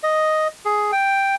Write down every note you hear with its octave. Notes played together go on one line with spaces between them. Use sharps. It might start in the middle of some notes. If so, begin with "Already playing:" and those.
D#5
G#4
G5